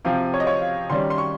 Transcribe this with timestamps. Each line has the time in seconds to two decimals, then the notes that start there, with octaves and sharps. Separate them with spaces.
0.05 C3 F3 C4 F5
0.34 C#5
0.40 D#5
0.47 C#5
0.61 F5
0.90 D#3 G3 C#4 C6
1.10 C6
1.18 C#6